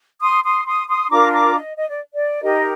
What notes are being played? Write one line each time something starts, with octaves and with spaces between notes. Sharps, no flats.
C6 D#6
C6 D#6
C6 D#6
C6 D#6
D4 F4 A#4 A#5 D6
A#5 D6
D#5
D#5
D5
D5
D#4 G4 A#4 D#5